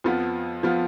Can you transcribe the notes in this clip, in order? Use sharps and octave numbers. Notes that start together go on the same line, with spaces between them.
F2 F3 B3 F4
F3 B3 F4